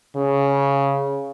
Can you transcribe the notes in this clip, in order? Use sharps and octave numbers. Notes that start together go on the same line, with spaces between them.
C#3